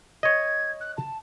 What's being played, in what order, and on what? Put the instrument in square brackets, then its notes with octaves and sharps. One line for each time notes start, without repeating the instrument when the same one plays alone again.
[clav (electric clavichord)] C#5 D#5 [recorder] G#6
[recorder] F#6
A5